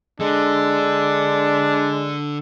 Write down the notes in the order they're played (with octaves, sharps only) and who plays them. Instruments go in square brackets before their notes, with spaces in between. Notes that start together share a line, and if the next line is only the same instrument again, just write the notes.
[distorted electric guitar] D3 [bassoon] G#3 [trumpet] D4